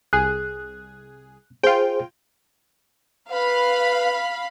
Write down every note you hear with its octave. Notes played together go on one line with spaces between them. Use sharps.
C2 G#4 F#6
F4 G#4 C5 G5
B4 F5 B5